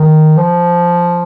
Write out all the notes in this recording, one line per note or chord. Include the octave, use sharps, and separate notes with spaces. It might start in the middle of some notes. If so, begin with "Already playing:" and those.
Already playing: D#3
F3